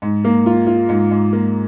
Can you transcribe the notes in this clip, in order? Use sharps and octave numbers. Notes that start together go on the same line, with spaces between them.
G#2
A#3
F4
F4
G#2
G#2
A#3